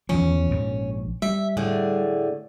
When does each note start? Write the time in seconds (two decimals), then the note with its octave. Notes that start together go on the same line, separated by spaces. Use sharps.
0.09 E2 D#3 F3 C#4
0.51 A#1 G#2
1.22 G3 E5
1.57 A2 D3 G#4